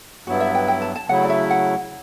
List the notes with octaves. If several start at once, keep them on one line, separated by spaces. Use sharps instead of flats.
G2 F#3 B3 E4 F#4
E5
G5
G5
A5
A5
C#3 F#3 A3 E4 F#5
D5
E5
F#5